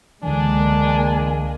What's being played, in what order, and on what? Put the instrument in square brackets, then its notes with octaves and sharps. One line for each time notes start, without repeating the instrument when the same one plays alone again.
[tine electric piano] C#2 D3 E3 [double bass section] G#3 A#3 [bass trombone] D4 [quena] G#5